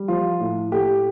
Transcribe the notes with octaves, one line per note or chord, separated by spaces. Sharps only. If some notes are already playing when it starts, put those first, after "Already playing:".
Already playing: G3
F3 F4
A2
A3 G4